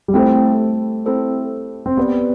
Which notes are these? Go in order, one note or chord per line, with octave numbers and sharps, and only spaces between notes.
G3
A3 C4 E4 A4 C5
C4 E4 A4 C5
C4
B3 G4 B4 D5 F#5